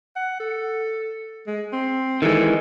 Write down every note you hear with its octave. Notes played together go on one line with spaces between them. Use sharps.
F#5
A4
G#3
C4
D#3 E3 G#3 A4